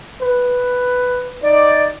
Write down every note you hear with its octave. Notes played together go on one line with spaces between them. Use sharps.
B4
D#4 D5